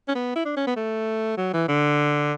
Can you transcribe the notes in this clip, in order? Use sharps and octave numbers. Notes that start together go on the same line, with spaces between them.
C#4
B3
E4
D4
C#4
B3
A3
F#3
E3
D3